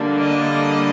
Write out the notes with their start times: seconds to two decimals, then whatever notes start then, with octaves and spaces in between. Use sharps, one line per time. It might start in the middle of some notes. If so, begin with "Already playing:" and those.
Already playing: D3 G3 A#3 D4
0.20 D#5